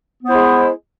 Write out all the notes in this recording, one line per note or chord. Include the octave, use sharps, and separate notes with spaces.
G#3 B3 E4 C5